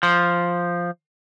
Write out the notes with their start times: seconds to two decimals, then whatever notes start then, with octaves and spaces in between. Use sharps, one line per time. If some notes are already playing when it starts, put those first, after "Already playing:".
0.03 F3